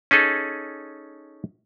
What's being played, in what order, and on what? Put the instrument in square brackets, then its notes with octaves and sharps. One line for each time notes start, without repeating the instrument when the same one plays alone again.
[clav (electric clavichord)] C#4 D#4 G#4 A4